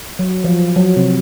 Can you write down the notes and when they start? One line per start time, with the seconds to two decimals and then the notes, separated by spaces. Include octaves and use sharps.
0.19 F#3
0.44 F3
0.76 F#3
0.96 C3